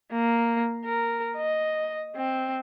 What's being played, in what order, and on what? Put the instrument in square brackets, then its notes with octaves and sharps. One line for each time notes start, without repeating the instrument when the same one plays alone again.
[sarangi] A#3
A#4
D#5
C4